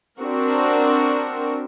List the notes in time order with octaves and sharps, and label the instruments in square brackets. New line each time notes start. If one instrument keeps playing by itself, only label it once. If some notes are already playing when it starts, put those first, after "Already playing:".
[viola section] C4 D4 F#4 A#4